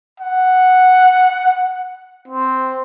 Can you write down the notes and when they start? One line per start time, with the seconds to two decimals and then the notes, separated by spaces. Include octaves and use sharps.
0.20 F#5
2.28 C4